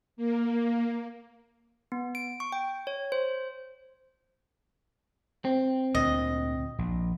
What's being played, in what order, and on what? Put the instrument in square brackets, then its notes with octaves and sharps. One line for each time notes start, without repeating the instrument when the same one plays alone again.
[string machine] A#3
[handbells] B3
D7
C#6
G5
C#5
C5
[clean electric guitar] C4
[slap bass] D2 A#2 [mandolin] D#5
[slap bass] A#1